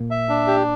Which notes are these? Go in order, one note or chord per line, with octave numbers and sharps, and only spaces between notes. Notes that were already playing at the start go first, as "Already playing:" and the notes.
Already playing: A#2
E5
D4
G4